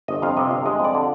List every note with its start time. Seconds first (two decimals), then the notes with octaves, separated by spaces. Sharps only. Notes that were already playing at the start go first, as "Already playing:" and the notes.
0.08 G1 D#5
0.22 F2 F5
0.37 C3 D#5
0.51 G1 F5
0.66 G#3 D#5
0.80 F2 D5
0.94 D3